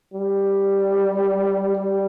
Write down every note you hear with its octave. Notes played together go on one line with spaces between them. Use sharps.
G3
G3